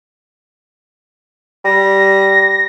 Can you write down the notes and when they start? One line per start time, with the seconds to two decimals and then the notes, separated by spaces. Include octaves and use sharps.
1.65 G3 A#6